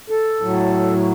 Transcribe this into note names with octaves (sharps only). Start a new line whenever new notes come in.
A4
A2 F#3